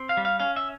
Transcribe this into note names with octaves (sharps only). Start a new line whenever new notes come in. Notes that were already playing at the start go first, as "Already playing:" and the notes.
Already playing: C4
F5
G3
F5
C#4 F5
E5